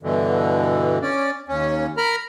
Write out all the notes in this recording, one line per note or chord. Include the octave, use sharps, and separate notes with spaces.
G2 B2 D3 E3
C#4 D5
D#2 C#4
A#4 A#5 B5 F6